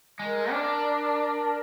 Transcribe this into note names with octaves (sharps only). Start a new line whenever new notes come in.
G#3 A#4
D4